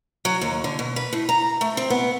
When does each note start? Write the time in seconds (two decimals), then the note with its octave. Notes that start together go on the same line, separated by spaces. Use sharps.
0.25 F#3
0.41 D#2
0.64 D3
0.79 B2
0.96 B4
1.13 A2
1.29 A#5
1.61 A3
1.77 C4
1.90 B3